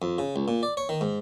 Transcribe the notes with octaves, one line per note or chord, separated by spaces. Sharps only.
F2
C#3
C#2
A#2
D5
C#5
D#3
G#2